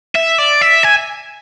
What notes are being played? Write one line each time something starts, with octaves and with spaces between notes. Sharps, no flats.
E5
D5
E5
G#5